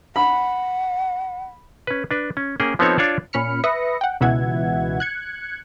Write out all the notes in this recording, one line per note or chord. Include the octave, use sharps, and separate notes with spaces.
F#5 B5
C#4 B4
D4 B4
C#4
A#3 C#4 G#4 G5
F3 B3 C4 D#4 A4 C#5
D4 F4 C#5 D5 A5
A#2 C#4 B5 F6 C#7
B4 E5 B5 D#6 A#6 C#7
F#5 G5
C#2 B2 E3 E5 F#5 G#6
F#6 G#6 C#7